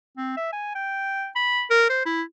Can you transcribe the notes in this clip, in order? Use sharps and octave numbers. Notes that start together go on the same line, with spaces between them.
C4
E5
G#5
G5
B5
A#4
C5
E4